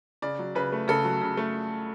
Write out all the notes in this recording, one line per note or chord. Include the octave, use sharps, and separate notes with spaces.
C#3 D5
F#3
C#3 B4
A3
C#3 A4
F#3
C#3
A3